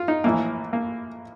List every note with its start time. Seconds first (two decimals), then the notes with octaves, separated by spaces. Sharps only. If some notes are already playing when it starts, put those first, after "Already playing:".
Already playing: F4
0.08 D#4
0.24 A#1 A2 E3 A#3
0.73 A#3